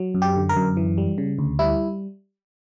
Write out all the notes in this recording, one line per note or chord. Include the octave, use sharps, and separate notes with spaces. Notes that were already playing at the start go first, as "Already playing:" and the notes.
Already playing: F#3
F#2
G4
D3
A#4
F#2
E3
G3
C#3
D2
G3 E4